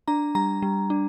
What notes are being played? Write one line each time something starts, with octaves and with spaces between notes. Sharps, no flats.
D4 A#5
G3 A#5
G3
D4